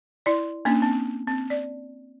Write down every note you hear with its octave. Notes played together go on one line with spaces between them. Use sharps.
E4 D5
A#3 C#4 D4
C4
C4
D5